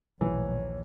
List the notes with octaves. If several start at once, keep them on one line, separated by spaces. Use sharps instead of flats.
A#1 D#2 B2 E3 F#3 A3 C#5